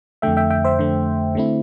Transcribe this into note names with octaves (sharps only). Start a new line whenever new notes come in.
F2 D3 A3 E5 G5
E5 G5
E5 G5
C5 E5
F2 D3 A3
D3 A3 C4 E4